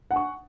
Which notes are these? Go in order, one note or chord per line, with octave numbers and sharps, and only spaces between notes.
F#5 G#5 C#6